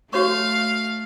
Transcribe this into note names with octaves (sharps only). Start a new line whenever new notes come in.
A3 F#4 C#5 F5 C#6